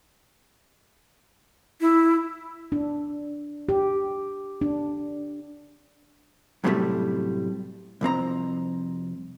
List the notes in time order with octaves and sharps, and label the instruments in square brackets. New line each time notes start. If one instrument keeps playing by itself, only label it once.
[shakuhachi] E4
[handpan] D4
G4
D4
[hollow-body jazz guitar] F#2 A2 C3 F3 G3 A3
C2 F2 C4 A#5